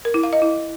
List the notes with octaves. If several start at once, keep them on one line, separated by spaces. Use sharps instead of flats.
A#4
E4
F5
D#5
E4